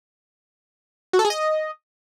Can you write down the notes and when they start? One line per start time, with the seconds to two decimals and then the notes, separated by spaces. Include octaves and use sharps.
1.13 F#4
1.19 A4
1.25 G#4
1.30 D#5